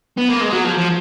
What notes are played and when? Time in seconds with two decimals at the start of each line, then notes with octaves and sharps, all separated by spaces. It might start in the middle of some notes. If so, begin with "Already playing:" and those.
0.18 B3
0.29 A#3
0.41 G#3
0.52 F#3
0.64 F3
0.77 F3